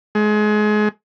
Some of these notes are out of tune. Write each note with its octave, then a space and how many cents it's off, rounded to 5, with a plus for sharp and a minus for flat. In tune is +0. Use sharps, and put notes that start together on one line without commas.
G#3 +30